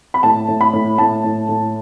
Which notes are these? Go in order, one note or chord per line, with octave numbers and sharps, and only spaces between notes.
B5
A2 A5
A2
B5
A2
A2 A5
A2
A2